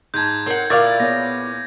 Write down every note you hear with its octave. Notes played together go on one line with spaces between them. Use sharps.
G#2 A5 G6 G#6
C4 A#4 C#5 F#5
A#2 E4 A#4 D5 F5 D6 A6
B3 G#4 C#5 A#6